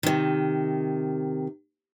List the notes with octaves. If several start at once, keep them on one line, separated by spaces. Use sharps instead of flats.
C3 D#3